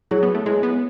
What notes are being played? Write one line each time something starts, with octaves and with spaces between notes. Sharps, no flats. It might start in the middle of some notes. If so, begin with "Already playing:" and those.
F#3 E4 G#4 C#5
B3
A3
G#3 E4 G#4 C#5
B3